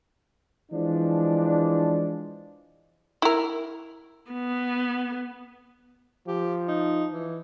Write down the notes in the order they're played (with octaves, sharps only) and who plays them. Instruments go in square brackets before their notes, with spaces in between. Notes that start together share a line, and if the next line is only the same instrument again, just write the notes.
[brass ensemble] E3 F3 G#3 D4
[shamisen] E4 A#4
[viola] B3
[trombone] F3 [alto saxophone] G4
[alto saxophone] D#4
E3